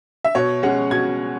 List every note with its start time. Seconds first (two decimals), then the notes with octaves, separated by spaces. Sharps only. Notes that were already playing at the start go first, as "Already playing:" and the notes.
0.24 E5
0.35 B2 C#5
0.63 G#3 C#4 F#5
0.91 B2 G#6